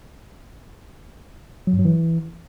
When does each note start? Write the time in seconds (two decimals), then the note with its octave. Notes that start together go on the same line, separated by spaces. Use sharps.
1.67 F#3
1.73 G2
1.79 F#3
1.85 E3